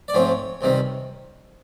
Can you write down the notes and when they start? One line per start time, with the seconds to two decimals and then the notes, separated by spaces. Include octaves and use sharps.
0.08 D5
0.14 G#2 F3 A3 C4 C#5
0.61 C#2 C3 D#3 G3 C4